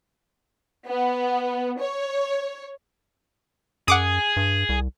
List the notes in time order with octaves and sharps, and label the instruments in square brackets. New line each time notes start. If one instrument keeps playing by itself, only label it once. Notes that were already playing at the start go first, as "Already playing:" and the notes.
[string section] B3
C#5
[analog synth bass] F#2 [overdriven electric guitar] G#4 [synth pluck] F#5 D6 D#6
[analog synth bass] G2
C2